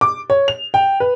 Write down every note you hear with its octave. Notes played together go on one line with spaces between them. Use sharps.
D6
C#5
F7
G5
B4